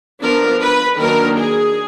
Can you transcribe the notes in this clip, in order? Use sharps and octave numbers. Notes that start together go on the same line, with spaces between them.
F3 B3 D4 A#4
B4
D#3 F#3 A#3 D4 A#4
G#4